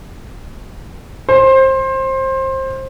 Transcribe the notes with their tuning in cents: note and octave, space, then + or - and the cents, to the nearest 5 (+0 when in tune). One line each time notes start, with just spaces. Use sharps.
C5 +25